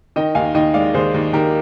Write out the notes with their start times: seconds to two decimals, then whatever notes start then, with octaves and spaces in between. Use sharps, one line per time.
0.16 D#3 D#5 G5
0.35 D#2 F5 G#5
0.54 D#2 D#5 G5
0.74 G#3 D5 F5
0.94 D#2 G#4 C5
1.14 D#2
1.33 D#2 G4 A#4